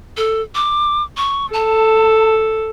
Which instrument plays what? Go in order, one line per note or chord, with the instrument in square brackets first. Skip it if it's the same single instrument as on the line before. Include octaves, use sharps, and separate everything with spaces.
[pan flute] A4
D6
C#6
[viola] A4 [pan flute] A5